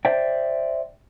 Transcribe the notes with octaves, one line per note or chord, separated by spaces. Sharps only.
C5 D5 E5 G5